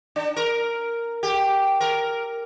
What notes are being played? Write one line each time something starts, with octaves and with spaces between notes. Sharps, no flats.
D4
A#4
G4
A#4